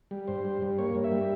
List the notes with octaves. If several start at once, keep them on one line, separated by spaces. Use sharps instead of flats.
G3
G2 C5
G3
G2
A#3 C#5
G2
E5
G3